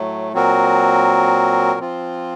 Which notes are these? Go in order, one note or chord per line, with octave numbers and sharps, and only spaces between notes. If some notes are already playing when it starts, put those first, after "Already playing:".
Already playing: A2 F#3 A3
A#2 F#3 C4 F#4 A#4
F3 C4 F4